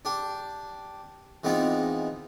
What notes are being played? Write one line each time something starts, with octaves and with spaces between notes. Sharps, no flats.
D4 G4
E3 G#3 B3 C4 D#4 F4